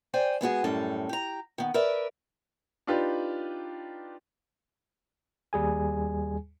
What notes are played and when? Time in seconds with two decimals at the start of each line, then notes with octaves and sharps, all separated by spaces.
0.14 C5 D5 G5 G#5
0.41 G#3 B3 F#4 G#4
0.64 F#2 A2 G3 C#4 A4
1.09 G4 A#5
1.58 D#3 B3
1.74 A#4 B4 D5 E5
2.87 D4 D#4 F4 G4 B4
5.53 D#2 G3 G#4 G#5